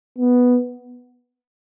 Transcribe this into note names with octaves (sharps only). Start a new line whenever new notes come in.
B3